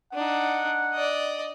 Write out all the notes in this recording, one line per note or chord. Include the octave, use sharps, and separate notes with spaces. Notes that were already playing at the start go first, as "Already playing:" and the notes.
D4 D#4 F#5
D5 D#5